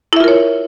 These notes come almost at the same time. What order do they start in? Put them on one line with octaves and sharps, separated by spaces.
E4 E5 F4 A#4 C#5